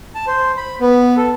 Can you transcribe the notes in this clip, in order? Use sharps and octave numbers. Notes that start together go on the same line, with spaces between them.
A5
C5
B5
B3
A4